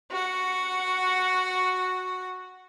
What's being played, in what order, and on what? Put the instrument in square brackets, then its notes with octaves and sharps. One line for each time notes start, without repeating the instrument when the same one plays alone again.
[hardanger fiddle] F#4 F#5